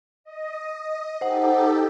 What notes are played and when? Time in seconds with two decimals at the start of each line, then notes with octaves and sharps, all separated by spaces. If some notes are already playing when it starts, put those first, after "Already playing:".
0.24 D#5
1.21 D#4 G4 A4 C5 F#5